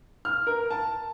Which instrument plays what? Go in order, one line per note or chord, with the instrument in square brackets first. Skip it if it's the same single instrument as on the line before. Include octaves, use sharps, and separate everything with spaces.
[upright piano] F6
A#4
A5